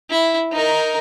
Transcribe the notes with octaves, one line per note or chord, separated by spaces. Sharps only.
E4
D#4 A#4